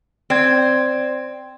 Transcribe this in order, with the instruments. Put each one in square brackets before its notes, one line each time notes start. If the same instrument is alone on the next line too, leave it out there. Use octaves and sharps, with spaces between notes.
[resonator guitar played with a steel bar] C4 [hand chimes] D5 G#6